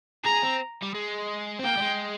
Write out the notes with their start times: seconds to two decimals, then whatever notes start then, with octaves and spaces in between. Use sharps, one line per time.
0.25 G#4 A#5
0.42 C4
0.82 G3
0.94 G#3
1.59 C4
1.64 A#3 G5
1.77 G3
1.82 G#3